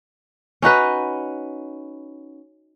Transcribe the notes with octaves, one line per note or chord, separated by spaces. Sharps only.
C#4 D#4 F#4 B4